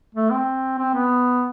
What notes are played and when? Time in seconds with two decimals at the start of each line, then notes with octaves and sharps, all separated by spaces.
0.15 A3
0.30 C4
0.79 C4
0.94 B3